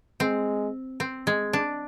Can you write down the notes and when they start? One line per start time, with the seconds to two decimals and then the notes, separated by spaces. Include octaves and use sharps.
0.20 G#3 C4
1.00 C4
1.27 G#3
1.53 D4